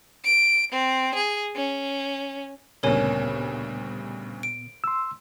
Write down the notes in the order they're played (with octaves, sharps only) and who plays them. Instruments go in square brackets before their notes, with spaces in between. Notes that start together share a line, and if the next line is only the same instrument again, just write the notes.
[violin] D7
C4
G#4
C#4
[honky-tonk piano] D2 G2 C#3 [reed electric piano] A#2 B3 [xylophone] A#4 C#5 G#5
[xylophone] D7
[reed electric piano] C6 E6